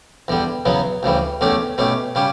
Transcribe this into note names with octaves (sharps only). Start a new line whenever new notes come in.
E2 D3 G3
E2 C#3 F#3 B3
D2 C#3 E3 G3
E2 D3 A3 C#4 G4
B2 A3 C#4 G4
C#3 G3 C#4 G4